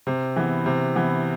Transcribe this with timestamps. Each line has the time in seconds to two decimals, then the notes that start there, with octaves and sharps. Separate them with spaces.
0.07 C3
0.36 E3 B3
0.66 C3
0.96 E3 B3